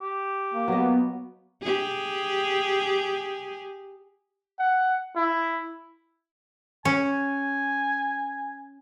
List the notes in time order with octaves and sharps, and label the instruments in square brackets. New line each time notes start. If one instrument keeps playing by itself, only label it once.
[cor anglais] G4
[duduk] A#3
[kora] F#3 D#5 [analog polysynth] B3
[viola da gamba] G4 G#4
[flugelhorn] F#5
E4
[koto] C#4 [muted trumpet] G#5